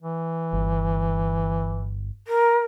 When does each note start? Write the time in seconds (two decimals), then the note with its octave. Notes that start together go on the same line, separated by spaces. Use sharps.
0.02 E3
0.53 G1
2.27 A#4